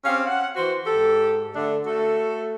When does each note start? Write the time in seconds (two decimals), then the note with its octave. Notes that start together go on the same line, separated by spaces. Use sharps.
0.05 C4 C#4 G4 F5
0.27 F#5
0.56 E3 F#4 C5
0.86 G#2 G4 A4
1.54 D3 A3 D4
1.85 A3 F#4 A4